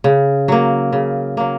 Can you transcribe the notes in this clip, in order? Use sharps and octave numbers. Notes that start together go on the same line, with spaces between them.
C#3
F#3 A#3
C#3
F#3 A#3